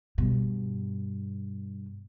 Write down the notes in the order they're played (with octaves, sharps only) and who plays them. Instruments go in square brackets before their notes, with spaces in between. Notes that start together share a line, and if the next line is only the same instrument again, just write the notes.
[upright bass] G2 B2